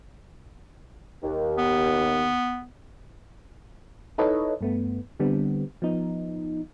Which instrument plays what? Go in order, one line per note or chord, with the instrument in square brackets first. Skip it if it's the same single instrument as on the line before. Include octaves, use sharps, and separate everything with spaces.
[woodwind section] D#2
[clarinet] B3
[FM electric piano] D#4 E4 A4 B4 C#5 D#5
G2 A3 B3
D3 G3 B3 C4 D4
F3 B3 D#4